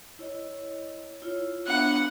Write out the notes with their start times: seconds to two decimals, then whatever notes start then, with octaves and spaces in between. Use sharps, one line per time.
0.19 E4 C#5 D#5
1.22 E4 F4 C#5
1.67 B3 D4 E5 F#5